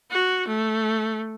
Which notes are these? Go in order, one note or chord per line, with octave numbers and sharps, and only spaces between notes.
F#4
A3